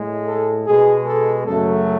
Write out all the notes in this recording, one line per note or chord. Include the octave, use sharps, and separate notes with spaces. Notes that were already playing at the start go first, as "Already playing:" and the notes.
Already playing: A2 G#3
A4
B2 G#3 G#4
A4
F#2 C#3 F#3 A3 A4